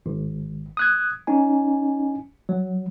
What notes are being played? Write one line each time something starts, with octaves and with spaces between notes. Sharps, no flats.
G#1
D#6 F#6 G#6
C#4 D#4 G#5
F#3